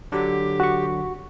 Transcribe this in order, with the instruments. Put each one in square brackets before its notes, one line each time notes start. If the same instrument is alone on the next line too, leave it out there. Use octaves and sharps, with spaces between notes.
[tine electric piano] D3 F#3 [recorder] G4
[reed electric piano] F#4 C#6